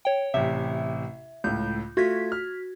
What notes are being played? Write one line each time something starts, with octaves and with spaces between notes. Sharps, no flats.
C#5 G5
A1 C3 E5
C#2 A2 G6
A3 F4 F#4 G#6 B6
F6